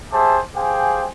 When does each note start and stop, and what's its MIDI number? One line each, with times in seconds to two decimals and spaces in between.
0.12 0.39 67
0.12 0.39 68
0.12 0.39 72
0.12 0.39 76
0.12 0.39 81
0.55 1.06 67
0.55 1.06 68
0.55 1.06 72
0.55 1.06 77
0.55 1.06 79
0.55 1.06 80